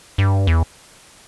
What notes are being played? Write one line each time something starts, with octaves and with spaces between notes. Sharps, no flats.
G2
E2